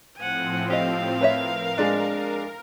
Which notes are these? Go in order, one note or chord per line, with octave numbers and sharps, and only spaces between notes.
A2 F3 C4 F#5 G#5
G4 D#5 F5
A#4 B4 C#5 E5
G#3 D4